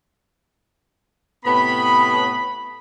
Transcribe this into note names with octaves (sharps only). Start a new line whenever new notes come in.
A2 C3 B3 B5